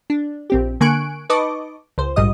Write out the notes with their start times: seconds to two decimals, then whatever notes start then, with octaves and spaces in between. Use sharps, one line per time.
0.10 D4
0.50 A#1 C4 G4
0.80 D3 A#3 G#5 C#6 F#6 D7
1.30 D#4 B4 D#5 A5 C#6 D6
1.98 C#2 C5
2.16 A#1 G#2 G3 D#5 D#6